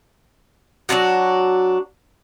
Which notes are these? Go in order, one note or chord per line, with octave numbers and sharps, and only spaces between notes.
F#3 D4 F4 F#4